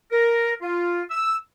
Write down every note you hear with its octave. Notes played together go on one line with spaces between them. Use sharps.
A#4
F4
E6